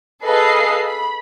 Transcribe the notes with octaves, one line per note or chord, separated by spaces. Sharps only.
G#4 A4 B4 D#5 F5 C7
B5